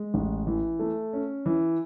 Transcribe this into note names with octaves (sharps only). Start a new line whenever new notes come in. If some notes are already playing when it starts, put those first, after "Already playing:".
Already playing: G#3
A1
E3
A3
C#4
E3